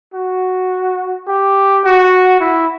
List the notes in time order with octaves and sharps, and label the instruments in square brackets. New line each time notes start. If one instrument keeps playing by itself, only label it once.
[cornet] F#4
G4
F#4
E4